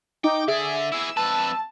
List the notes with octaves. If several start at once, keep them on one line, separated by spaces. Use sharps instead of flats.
D#4 G5 D6
D3 G#4 D5 E5
E4 G#4 E6
F2 B4 A5